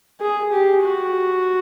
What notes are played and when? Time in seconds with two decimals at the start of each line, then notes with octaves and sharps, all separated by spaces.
0.20 G#4
0.52 G4
0.82 F#4